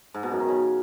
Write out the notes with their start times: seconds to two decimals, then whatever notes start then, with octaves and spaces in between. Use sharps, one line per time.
0.14 G#2
0.23 B2
0.32 F#2
0.40 D#3
0.49 C#3